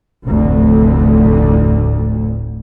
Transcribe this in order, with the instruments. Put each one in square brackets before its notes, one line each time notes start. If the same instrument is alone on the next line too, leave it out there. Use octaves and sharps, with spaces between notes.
[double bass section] F1 D2 A2